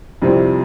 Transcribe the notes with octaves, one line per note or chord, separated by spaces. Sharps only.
F2 C3 G3 C4 E4